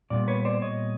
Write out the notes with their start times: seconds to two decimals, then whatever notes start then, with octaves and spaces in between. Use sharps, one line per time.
0.10 A#2 G3 B3 D5
0.28 B4 C#5
0.45 C5 D5
0.62 C#5 D#5